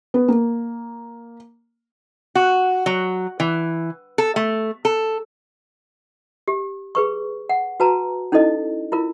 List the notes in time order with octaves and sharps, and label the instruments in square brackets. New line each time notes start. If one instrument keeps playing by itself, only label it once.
[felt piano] B3
A#3
[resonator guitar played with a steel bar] F#4
F#3
E3
A4
A3
A4
[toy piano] G4
G#4 B4 C#6
F#5
F#4 B4 A5 A#5
C#4 D#4 E4 A4 D#5
E4 F4 A#4